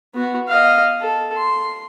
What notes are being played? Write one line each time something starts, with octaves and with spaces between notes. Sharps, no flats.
B3 F#4
D#5 F5
A4
C6